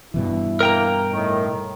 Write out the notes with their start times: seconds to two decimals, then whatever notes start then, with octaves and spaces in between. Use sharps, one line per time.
0.14 G2 B2 E3 E4
0.61 A#3 A#4 G5 A#5
1.12 A2 D#3